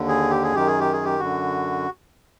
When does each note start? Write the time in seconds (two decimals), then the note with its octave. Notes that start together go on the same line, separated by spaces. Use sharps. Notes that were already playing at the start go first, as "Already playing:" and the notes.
Already playing: D#2 D3
0.08 G#4
0.30 G4
0.43 G#4
0.53 F#2 D#3 G4
0.67 G#4
0.80 G4
0.93 G#4
1.05 G4
1.20 F#2 D3 F#4